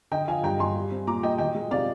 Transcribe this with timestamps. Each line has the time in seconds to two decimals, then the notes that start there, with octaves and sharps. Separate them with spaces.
0.11 D3 D#5 G5
0.28 F3 F5 G#5
0.43 G2 G5 A#5
0.59 G2 G#5 C6
0.76 G3
0.91 C4
1.07 A#2 A#5 D6
1.23 A#2 D#5 G5
1.38 D#3 D#5 G5
1.55 G#3
1.71 C3 D5 F5